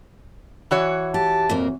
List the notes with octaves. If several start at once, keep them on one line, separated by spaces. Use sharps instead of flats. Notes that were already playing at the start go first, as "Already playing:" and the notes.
E3 F#4 C#5
G4 A5
F2 A#2 A#3